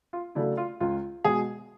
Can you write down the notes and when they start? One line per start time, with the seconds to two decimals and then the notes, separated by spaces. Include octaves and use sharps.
0.13 F4
0.35 C#3 F#3 A3 D4 E4
0.57 F4
0.80 C#2 F4
1.24 B2 G#3 G#4